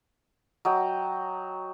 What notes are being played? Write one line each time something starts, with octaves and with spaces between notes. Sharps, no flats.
F#3 D#5 G5 A5